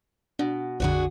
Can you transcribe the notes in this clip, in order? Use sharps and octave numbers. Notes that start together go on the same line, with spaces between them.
B2 D4
A#1 F2 D3 D4 F#4 G#4